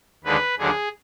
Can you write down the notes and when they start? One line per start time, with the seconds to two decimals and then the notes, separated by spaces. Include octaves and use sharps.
0.24 D#2 D3 G#3 D4 B4
0.58 D#2 D3 F#3 D4 G#4